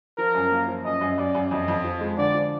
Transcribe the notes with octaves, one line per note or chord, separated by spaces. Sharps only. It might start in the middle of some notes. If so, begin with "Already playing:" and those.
F3 A#4
F#2
A#3
F3
F#2 D#5
F#2
F#2 D5
F#2
F2 D#5
F2
F3
G#3
D3 D5
F3